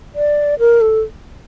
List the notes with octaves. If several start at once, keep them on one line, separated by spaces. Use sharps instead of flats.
D5
A#4
A4